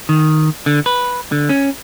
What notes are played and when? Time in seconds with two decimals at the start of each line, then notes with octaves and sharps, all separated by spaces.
0.09 D#3
0.66 D3
0.86 B4
1.32 D3
1.49 C#4